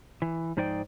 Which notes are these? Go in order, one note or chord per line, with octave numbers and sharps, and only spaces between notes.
E3
G#2 F3 D#4 C5 D5 G5